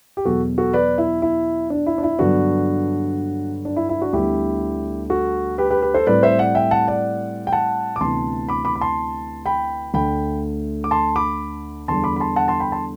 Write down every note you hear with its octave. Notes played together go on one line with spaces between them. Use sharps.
G4
E2 B2 F#3 F#4 A4
F#4 A4
B4 D5
E4
E4
D4
E4
D4
E4
G2 D3 F#3 B3 D4 F#4
D4
E4
E4
D4 F#4
D2 D3 G3 B3 E4 G4
F#4 A4
G4 B4
G4 B4
G4 B4
A4 C5
A2 G3 C4 B4 D5
C5 E5
D5 F#5
E5 G5
F#5 A5
D5 F#5
G5
F#5 A5
D6
D2 C3 E3 B3 A5 C6
B5 D6
B5 D6
B5
A5 C6
G5 B5
D2 D3 A3 G5 B5
D6
A5 C6
B5 D6
E2 D3 G3 A5 C6
B5 D6
B5
A5 C6
F#5 A5
A5 C6
G5 B5
A5 C6